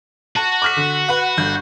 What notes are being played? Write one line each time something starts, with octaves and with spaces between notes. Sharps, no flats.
F#4 A5
D6 F6 B6
D3
B4 F#5
G1 G6